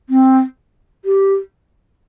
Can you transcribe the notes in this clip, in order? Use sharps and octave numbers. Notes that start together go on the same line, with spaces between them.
C4
G4